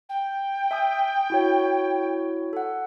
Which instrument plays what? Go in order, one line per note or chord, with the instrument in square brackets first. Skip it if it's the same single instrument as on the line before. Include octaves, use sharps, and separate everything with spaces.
[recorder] G5
[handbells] E5 G#5 D#6
E4 F#4 C#5
A4 F#5